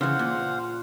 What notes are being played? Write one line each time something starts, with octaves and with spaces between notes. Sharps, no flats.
C#3 E3 C5 F5 F#5
A#2